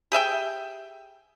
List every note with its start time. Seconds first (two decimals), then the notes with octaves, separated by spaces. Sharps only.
0.12 G4 G#4 E5 G5